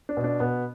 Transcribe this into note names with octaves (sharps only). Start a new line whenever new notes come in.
D4
B2
D4
B2 B3